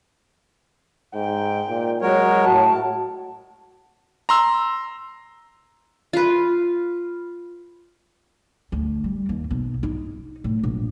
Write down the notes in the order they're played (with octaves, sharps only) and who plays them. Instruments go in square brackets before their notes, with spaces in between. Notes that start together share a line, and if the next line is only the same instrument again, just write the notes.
[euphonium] G#2 [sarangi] G5
[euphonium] A#2
[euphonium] F#3 [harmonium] G#3 A#4 C#5 [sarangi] F#4
[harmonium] A2 [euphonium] F#4 [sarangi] A5
[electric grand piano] A#5 C6 E6
[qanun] F4 B4
[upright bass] D2
G3
D#2
B1
D#4
A2
A#1